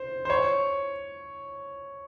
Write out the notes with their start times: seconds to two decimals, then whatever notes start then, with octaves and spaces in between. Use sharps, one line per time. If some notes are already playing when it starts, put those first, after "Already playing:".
Already playing: C5
0.25 C5
0.30 C#5